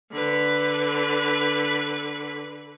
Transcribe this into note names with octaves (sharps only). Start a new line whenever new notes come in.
D3 B4